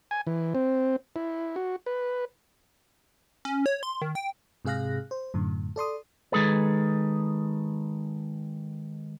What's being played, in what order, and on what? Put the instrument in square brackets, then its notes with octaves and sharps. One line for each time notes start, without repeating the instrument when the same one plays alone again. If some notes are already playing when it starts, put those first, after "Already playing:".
[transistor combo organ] G#5
E3
C4
E4
F#4
B4
[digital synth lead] C#4
C#5
C6
D#3
G5
[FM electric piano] G#2 C3 G#4 F5 F#6 A#6
C5
F#2 A2 D3
A4 D5 C6 D#6
[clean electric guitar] D#3 G#3 G#4 A4 B4